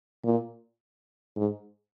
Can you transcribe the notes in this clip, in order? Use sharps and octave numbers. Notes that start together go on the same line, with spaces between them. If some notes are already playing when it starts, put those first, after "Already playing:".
A#2
G#2